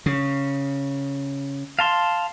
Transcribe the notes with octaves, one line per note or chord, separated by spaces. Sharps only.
C#3
F5 A5 C6